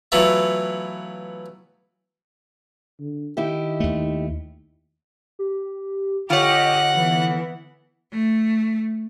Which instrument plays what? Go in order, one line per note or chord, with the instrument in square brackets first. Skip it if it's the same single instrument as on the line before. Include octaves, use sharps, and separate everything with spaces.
[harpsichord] E3 F#3 A3 B3 F4
[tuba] D3
[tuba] D#3 [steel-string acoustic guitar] D#4 E4 G4
[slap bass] D#2 A3
[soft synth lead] G4
[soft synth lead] D3 [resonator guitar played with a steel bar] F4 C#5 [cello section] G4 D#5 [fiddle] F#5
[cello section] E3 B3
[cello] A3